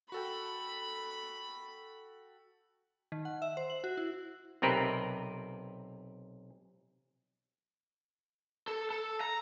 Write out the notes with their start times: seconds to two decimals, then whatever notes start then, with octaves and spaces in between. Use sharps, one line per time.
0.12 F#4 A4 G5 B5
3.12 D#3
3.25 F#5
3.42 E5
3.57 C5
3.70 F#7
3.84 F#4
3.97 E4
4.62 B1 C3 C4 A#4 B4
8.68 A4
8.91 A4
9.21 A#5